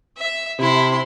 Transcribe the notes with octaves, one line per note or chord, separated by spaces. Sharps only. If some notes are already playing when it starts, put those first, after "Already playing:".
E5
C3 E4 C6